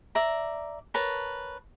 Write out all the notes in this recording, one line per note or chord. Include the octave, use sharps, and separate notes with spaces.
D5 E5 A#5
A#4 B4 C#5 A5